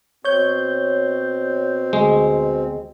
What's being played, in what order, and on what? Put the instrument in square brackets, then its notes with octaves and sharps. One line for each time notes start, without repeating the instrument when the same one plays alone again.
[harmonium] B2 C4 [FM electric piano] C#5 G6
[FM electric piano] D2 [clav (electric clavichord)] G#3